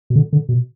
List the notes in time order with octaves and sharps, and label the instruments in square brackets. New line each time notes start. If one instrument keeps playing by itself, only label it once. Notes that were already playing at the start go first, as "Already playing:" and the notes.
[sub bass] B2
D3
D3
B2